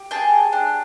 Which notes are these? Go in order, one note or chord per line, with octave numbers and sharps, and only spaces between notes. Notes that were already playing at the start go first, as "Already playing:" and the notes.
Already playing: G4
G#4 G5 A5
D4